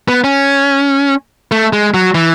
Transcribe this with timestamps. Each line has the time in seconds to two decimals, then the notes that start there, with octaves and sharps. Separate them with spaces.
0.08 B3
0.24 C#4
1.51 A3
1.73 G#3
1.94 F#3
2.15 E3